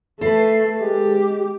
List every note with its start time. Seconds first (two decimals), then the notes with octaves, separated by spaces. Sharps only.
0.21 A3 A4 B4 C7
0.81 G#3 G4